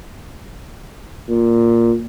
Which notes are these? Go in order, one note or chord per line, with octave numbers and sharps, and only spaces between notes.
A#2